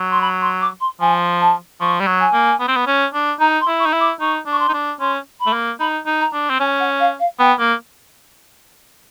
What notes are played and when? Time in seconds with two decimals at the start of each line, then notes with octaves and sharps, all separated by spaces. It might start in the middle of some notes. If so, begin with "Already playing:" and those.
Already playing: F#3
0.11 C6
0.21 B5
0.41 C6
0.61 D6
0.80 C6
1.01 F3 G#5
1.40 A5
1.80 F3 C#6
2.00 G3
2.07 F#3
2.20 G#5
2.33 A#3
2.60 B3
2.68 C4
2.76 B3
2.87 C#4
3.14 D4
3.40 D#4 A#5
3.61 C6
3.67 E4
3.79 C#6
3.86 D#4
3.93 E4
4.00 D6
4.20 D#4 C#6
4.46 D4
4.52 C#6
4.59 C6
4.69 D#4
4.73 D4
5.00 C#4 C6
5.40 B5
5.46 A3
5.53 A#3
5.80 D#4 B5
6.06 D#4
6.20 A#5
6.33 D4
6.50 C4
6.59 C#4 G#5
6.80 F#5
7.00 F5
7.19 F5
7.39 B3 G5
7.59 A#3